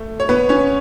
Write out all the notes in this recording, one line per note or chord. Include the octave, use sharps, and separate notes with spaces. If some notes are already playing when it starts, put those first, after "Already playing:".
Already playing: A3
C#5
B3 B4
C#4 C#5